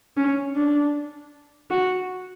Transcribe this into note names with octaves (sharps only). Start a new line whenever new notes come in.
C#4
D4
F#4